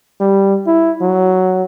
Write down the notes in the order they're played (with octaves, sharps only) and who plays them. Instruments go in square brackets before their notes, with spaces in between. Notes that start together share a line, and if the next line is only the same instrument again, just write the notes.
[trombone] G3
E4
F#3